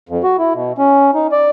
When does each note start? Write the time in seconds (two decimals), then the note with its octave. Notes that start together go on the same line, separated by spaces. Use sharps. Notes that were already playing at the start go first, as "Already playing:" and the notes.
0.09 F2
0.23 F#4
0.38 E4
0.54 B2
0.78 C#4
1.14 D#4
1.32 D5